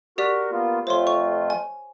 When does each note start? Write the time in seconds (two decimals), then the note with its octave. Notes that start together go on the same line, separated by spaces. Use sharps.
0.18 F#4 G4 A#4 D5 B6
0.52 A#3 B3 F4
0.87 F2 A3 F4 C5 C#5 C6
1.07 C#6
1.50 G#5